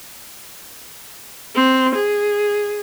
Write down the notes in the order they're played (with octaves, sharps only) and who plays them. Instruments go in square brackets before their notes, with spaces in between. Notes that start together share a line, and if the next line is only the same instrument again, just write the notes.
[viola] C4
G#4